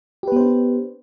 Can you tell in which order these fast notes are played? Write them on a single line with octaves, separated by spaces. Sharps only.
G4 B4 B3 C5 D4